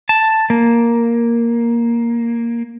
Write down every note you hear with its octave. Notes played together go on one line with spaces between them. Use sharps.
A5
A#3